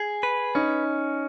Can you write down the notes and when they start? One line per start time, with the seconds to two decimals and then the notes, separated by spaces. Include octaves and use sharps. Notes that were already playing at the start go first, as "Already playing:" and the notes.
Already playing: G#4
0.23 B4
0.55 C#4 D#4